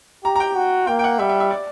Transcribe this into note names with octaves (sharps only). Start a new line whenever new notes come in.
G4 A#5
A#5
G5
F#4
A#3 G5
G5
F#5
G3 E5
E5
E5
D5